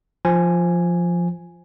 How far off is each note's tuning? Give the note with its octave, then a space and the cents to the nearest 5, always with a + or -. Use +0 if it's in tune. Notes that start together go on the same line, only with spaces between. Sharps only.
F3 +0 G#5 +0